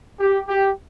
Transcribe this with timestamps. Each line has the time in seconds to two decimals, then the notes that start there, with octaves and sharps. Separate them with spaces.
0.19 G4
0.48 G4